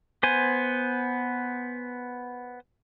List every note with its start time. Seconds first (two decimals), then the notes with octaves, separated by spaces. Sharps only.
0.23 B3 C5 G#5